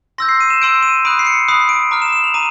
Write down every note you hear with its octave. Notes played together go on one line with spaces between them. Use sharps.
C6 E6 G6 A#6
C7
D#7
E7
C6 E6 G6 D7
D#7
B5 D#6 F#6 D7
C7
C#7
B5 D#6 F#6 C7
D7
A#5 D6 F6
E7
E7
F7
A#5 D6 D#7